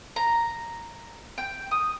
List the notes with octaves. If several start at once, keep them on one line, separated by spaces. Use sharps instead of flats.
A#5
G5
D#6